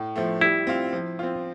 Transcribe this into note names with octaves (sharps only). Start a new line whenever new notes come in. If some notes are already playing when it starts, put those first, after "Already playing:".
Already playing: A2
F3 A3
G3 E4
C4 F4
F3
C4 F4